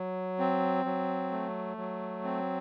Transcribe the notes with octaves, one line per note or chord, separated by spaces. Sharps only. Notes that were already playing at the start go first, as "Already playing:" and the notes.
Already playing: F#3
C4
F#3
A3
F#3
C4